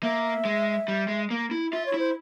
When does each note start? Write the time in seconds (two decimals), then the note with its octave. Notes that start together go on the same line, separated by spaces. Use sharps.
0.03 A#3 E5
0.45 G#3
0.88 G3
1.08 G#3
1.31 A#3
1.51 E4
1.72 F4 E5
1.86 C#5
1.94 E4 C5